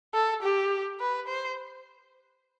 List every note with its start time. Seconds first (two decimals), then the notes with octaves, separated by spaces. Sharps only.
0.14 A4
0.42 G4
1.00 B4
1.27 C5